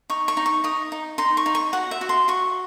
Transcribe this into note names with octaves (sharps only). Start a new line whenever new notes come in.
D#4 C#6
C#6
D#4
C#6
D#4 D#6
D#4
D#4 C6
C#6
D#4
C#6
F#4 F#5
E5
F#4
C6
F#4 C#6